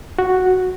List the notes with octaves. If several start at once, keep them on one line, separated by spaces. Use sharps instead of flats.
F#4